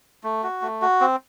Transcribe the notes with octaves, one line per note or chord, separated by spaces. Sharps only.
A3
F#4
A3
F#4
C4